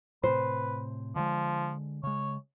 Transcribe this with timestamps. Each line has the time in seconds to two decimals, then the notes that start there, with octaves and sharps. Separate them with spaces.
0.24 A2 C3 B4 C5
1.16 D3 F3 G#3
2.03 C#3 G#3 C#5